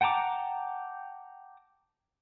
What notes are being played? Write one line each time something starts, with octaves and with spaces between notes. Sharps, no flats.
F#5 G5 A5 A#5 D6